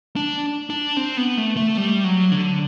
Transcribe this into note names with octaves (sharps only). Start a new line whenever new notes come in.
D4
D4
C4
B3
A3
A3
G3
F#3
D3